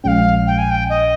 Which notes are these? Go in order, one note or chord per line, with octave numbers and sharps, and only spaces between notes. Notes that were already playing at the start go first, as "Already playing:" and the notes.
A#1 A#2 F3 G#3 C#4 F5 G5
G5
G#5
G5
D#5